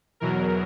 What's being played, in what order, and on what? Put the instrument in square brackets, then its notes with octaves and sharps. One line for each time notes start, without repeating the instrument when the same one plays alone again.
[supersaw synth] E2 B2 F#3 A#4